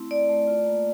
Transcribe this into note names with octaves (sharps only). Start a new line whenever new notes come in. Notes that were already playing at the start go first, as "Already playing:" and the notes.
Already playing: A3 C4 E4
A3 D5
A3
F4
A#3